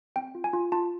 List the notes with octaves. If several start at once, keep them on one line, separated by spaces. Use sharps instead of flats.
C4 G5
F4
G#5
F4
F4 A5